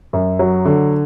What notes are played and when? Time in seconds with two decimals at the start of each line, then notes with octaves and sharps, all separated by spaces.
0.13 F#2
0.39 F#3
0.65 D3